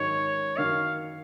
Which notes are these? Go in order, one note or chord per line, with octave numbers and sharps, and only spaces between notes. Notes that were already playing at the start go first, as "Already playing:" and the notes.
Already playing: G#2 D#3 F#3 C#4 C#5
F#2 D#3 A#3 F5